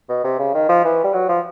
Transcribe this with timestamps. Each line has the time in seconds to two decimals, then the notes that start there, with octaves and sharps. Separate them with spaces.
0.09 B2
0.24 C3
0.39 C#3
0.54 D#3
0.69 F3
0.84 E3
1.04 G3
1.14 F#3
1.29 F3